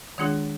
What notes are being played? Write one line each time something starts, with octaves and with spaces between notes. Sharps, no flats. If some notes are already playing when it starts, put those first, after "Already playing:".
D#3 G#3 D4 F4 G#4